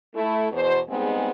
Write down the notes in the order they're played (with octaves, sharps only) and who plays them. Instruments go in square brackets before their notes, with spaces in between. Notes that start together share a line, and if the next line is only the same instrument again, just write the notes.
[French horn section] A3 E4
E2 B2 C5
G3 G#3 B3 C4 D#4 G#4